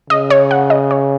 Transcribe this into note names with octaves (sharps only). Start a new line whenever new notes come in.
C#3 D#5
C#5
F#5
D#5
C#5